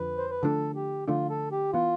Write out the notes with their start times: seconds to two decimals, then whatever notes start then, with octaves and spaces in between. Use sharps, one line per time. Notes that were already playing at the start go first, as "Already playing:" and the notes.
Already playing: F2 D3 F3 B4
0.17 C5
0.30 B4
0.42 D3 F3 A3 D4 A4
0.75 G4
1.08 D3 F3 A3 D4 F4
1.30 A4
1.52 G4
1.73 E3 B3 F4